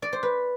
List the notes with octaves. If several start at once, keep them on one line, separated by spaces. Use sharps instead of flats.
D5
C5
B4